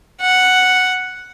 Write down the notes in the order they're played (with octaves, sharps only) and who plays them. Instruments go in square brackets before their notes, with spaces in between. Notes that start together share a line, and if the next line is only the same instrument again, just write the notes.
[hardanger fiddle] F#5